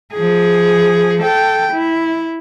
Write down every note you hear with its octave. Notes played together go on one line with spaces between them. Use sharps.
F3 G#4
A4 G5
E4